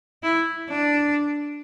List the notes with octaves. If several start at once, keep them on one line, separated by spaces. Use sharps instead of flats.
E4
D4